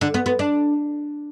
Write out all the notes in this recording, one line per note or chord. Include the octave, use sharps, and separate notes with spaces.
D3
B3
B3
D4